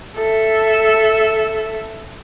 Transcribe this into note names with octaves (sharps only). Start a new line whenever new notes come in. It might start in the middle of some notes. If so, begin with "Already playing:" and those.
A4 E5